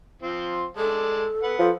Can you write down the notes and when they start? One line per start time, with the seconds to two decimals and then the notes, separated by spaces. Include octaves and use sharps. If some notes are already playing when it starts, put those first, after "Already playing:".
0.22 F3 C4 F4
0.77 G#3 A4 D5 A5
1.43 B4 F#5
1.59 F3 A4